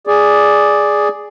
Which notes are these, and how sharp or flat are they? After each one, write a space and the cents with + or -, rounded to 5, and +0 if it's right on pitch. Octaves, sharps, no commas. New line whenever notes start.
G#4 +0 D5 +0